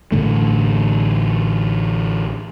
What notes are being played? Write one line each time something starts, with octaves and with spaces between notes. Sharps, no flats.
A1 A2 D3 A3